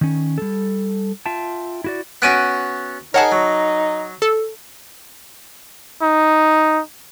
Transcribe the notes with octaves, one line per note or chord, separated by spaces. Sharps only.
D#3 C#4
G3 A4
F4 E5 G5 A5
E4 F#4 D5
B3 C#4 F#4 F#6 D7 D#7
D#4 G#4 A#4 C#5 F#5 A5
F#3
A4
D#4